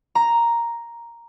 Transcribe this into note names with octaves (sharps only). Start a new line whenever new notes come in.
A#5